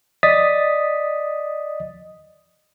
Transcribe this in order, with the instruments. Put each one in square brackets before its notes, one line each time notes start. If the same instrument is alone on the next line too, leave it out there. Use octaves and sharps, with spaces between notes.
[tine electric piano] D5 D#5 D#6 A6 B6